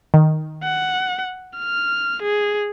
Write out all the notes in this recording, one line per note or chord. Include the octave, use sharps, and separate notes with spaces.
D#3
F#5
F6
G#4